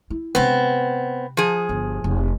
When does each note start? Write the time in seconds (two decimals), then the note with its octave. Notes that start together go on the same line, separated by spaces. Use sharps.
0.10 E4
0.35 C3 G#3 B3 C4
1.37 F3 G#4
1.69 G1
2.04 F1